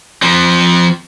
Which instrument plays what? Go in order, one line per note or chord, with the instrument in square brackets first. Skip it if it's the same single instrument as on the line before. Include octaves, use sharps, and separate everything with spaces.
[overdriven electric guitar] F3 C4